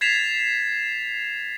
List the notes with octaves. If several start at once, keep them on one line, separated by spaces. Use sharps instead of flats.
G#6 A6 B6 C7 E7 F7